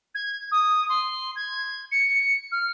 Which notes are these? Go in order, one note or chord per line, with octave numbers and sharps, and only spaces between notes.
G#6
D#6
C6
G#6
C#7
F6